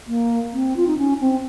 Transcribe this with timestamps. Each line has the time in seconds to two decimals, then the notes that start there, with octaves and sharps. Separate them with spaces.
0.08 A#3
0.53 C4
0.76 F4
0.87 D#4
0.98 C#4
1.21 C4